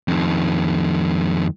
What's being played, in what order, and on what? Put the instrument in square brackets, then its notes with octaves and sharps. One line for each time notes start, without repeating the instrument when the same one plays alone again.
[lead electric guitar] F2 D#3